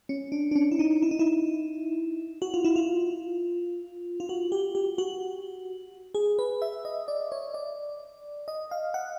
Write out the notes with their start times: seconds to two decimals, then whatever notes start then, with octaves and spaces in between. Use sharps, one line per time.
0.09 C#4
0.32 D4
0.51 D4
0.56 C#4
0.71 E4
0.79 D#4
1.02 E4
1.11 D#4
1.19 E4
2.42 F#4
2.54 F4
2.64 E4
2.76 F4
4.20 F4
4.29 F#4
4.52 G4
4.75 G4
4.98 F#4
6.14 G#4
6.39 B4
6.62 E5
6.85 D#5
7.08 D5
7.32 C#5
7.54 D5
8.48 D#5
8.71 F5
8.94 F#5